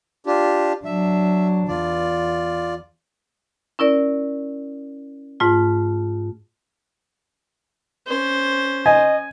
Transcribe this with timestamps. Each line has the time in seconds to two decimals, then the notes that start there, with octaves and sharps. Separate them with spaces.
0.26 D4 F4 G4
0.85 F#3 D4 E5
1.68 E2 F4 D5
3.79 C#4 E4 A#4 D5
5.40 G#2 A3 F4
8.07 C#4 C5
8.86 D#5 G#5